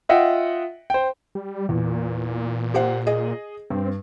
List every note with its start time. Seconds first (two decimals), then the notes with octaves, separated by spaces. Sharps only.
0.09 F4 D#5 E5 F#5 G5
0.90 C5 G5
1.35 G3
1.69 E2 A#2
2.74 G4 C5 F#5
3.07 G#4 D#5
3.70 G2 C4